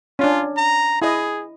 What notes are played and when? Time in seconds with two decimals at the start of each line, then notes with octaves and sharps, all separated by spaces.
0.19 C#4 D4 F4
0.57 A#5
1.02 E4 G#4 D#5